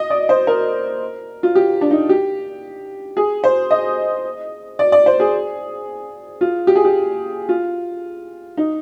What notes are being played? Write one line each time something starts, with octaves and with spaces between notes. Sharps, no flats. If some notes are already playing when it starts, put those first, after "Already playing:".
Already playing: D#5
D5
C5
A#4
F4
G4
D4
D#4
G4
G#4
C5
D#5
D5
D5
C5
G#4
F4
G4
G#4
G4
F4
D#4